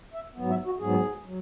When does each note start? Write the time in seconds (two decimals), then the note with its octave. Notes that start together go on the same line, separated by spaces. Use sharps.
0.14 E5
0.36 G#2 F#3 B3
0.50 E5
0.66 F#4
0.80 G#2 F#3 B3 G#4
1.25 F#3